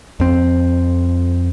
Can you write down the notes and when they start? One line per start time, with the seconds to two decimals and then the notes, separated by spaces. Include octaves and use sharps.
0.20 F2 C4